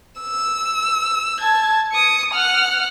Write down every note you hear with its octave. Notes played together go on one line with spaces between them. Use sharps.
E6
A5 G#6
D#6 C#7
F#5 F6